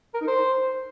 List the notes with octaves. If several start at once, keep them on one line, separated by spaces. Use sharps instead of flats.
A#4
D#4
C5